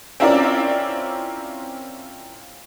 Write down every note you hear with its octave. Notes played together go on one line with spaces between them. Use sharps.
C4 C#4 E4 F4 A#4 D5